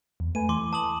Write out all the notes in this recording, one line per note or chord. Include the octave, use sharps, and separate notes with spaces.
E2
A3 B4 G#5 D#7
E3 C6 D6
A5 D#6 F#7